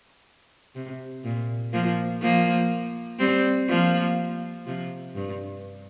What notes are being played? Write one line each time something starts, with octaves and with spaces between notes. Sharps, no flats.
C3
A#2
F3 A#3
F3 A#3
G3 C4
F3 A#3
C3 F3
G2